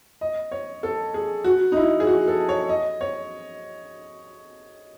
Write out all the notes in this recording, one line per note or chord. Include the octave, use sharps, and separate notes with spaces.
D#5
C#5
A4
G#4
F#4
D#4
E4
G#4
F#4
A4
C#5
D#5
C#5